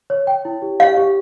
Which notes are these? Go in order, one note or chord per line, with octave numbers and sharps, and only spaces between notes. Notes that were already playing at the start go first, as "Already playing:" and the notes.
C#5
G5
E4
G4
G4 F5
G4